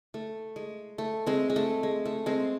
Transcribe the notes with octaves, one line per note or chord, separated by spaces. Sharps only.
A3
G#3
A3
G#3 C4
G#3
A3
G#3
A3
G#3 C4